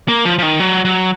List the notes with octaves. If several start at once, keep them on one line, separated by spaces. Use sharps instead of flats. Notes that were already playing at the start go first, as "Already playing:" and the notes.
A#3
F3
F3
D#3
F#3
F#3